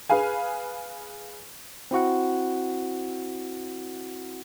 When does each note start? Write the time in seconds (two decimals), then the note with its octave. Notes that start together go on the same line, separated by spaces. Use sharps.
0.10 G#4 B4 F5 G#5
1.91 C4 E4 F#4 F#5